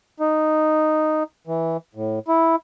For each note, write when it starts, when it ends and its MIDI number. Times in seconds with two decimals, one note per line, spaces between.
0.20 1.23 63
1.47 1.77 52
1.95 2.19 45
2.28 2.56 64